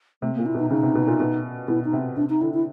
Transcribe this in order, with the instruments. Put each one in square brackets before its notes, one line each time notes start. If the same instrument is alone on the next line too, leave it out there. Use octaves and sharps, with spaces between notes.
[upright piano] C3 [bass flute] A3
[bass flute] A#3
[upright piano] A#2
[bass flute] E4
[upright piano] B2 [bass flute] D#4
[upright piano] C#3 [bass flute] D#4
[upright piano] C3
B2
A#2
B2
[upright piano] B2 [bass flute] E4
[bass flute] D#4
[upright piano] C3
[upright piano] C3 [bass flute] D4
[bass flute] D#4
[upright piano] D3 [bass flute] E4
[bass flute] E4